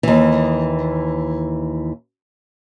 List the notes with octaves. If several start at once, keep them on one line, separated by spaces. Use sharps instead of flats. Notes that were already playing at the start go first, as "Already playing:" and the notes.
D#2 E3